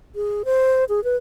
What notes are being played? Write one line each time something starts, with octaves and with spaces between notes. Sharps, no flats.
G#4
C5
G#4
B4